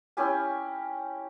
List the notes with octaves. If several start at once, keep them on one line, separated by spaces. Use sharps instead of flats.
C#4 E4 G4 G#5